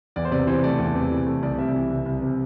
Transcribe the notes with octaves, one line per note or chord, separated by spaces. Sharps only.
E2 D5
C5
C3 D5
E3 C5
A3 D5
E2
C3
E3
A3
C2 D5
C3 E5
E3
C2
C2
C3